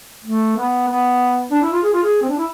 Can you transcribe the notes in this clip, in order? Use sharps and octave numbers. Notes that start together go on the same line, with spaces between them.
A3
B3
B3
D4
E4
F4
G#4
F4
G#4
C4
D4
E4